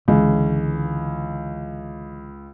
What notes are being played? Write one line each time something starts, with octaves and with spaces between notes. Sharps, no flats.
C#2 D3 E3